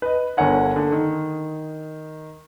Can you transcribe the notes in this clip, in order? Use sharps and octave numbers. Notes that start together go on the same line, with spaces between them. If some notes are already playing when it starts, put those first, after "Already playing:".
B4 D#5
G1 D3 A#4 C#5 F#5 G#5
D3 A#3
D#3